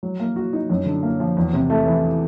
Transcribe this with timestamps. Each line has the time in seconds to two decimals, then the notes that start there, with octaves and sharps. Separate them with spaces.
0.03 F#3
0.20 A#3
0.36 F#4
0.53 D#4
0.70 F#2
0.86 D3
1.03 A#3
1.20 F3
1.37 E2
1.53 C3
1.70 A3
1.86 E3